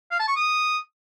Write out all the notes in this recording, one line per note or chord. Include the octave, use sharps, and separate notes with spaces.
F5
A5
C#6
D#6